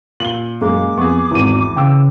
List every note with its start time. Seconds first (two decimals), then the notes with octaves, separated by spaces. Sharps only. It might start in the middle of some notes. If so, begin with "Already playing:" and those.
0.20 A#2 F#7 G7
0.61 F#2 G#3 A#3 D6
0.98 F2 B3 G#4 C#6
1.31 G#1 E2 E3 D#7
1.76 C#3 G5 D6 E6